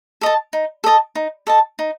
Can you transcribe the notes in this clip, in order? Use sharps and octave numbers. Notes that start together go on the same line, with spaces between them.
A4 D#5 A5
D#4
A4 D#5 A5
D#4
A4 D#5 A5
D#4